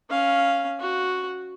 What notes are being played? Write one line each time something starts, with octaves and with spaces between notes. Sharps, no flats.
C#4 F5
F#4